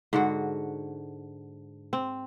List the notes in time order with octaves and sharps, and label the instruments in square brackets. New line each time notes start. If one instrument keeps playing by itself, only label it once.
[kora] G#2 D3 F#4
C4